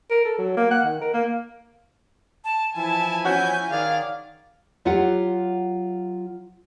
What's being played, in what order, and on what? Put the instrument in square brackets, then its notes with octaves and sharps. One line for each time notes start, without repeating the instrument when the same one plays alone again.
[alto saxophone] A#4
A4
F#3
A#3
F#5
D#3
A#4
A#3
[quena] A5
[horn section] E3 F3 E4 [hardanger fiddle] G#5 [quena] A5
[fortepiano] C#4 F#4 F#5 [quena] G6
[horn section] D#3 D5 [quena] G#4 [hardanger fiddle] F5
[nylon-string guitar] F#3 F4 G4 F#5